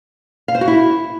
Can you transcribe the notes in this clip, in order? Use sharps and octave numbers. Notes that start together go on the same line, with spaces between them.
F5
C5
F#4
E4